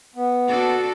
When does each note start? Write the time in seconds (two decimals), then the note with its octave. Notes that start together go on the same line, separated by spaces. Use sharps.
0.16 B3
0.48 D4 F#4 A4